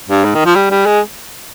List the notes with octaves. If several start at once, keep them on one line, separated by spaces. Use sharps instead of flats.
G2
G#2
D#3
F3
G3
G3
G#3